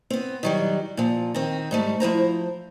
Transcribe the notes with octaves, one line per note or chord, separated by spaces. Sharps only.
B3 C4
D#3 F#3 G3
A#2 F3
D#3 C4
G#2 G3 A3
F3 E4 C5 A#5